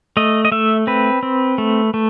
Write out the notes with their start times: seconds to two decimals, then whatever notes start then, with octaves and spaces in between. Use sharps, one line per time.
0.17 A3 D#5
0.45 D#5
0.52 A3 E5
0.87 C4 B4
1.23 C4
1.58 A3
1.94 A3